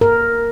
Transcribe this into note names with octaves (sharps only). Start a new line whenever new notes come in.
A#4